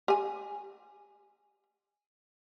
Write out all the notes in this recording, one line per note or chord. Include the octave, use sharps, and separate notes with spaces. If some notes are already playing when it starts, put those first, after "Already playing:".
G4 G#5